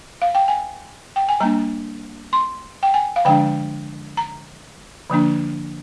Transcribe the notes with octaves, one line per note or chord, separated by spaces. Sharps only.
F5
G5
G#5
G5
G#5
G3 A#3 D4 A#5
C6
G5
G#5
F5
D3 F3 G#3 D4 G5
A#5
D3 F3 A#3 D4